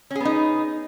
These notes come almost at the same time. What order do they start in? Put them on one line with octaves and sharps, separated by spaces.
C#4 G#4 B3 D#4